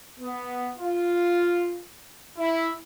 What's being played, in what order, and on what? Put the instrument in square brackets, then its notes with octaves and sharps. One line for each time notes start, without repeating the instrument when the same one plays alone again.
[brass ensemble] B3
F4
E4